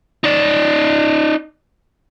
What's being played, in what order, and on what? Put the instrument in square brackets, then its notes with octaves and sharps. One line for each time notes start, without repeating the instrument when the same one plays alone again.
[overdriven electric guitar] D#4 D5